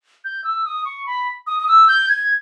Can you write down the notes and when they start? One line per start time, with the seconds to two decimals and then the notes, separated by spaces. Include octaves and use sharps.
0.24 G6
0.44 E6
0.65 D#6
0.85 C#6
1.06 B5
1.47 D#6
1.60 D#6
1.68 E6
1.88 G6
2.09 G#6